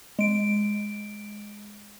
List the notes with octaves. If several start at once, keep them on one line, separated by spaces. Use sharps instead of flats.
G#3 D7